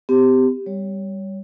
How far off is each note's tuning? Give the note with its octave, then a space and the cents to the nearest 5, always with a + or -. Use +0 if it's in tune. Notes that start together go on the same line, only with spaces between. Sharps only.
C4 -45 G4 +0
G3 +0 C#5 +15